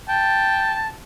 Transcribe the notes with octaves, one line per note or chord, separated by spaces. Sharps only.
G5 A5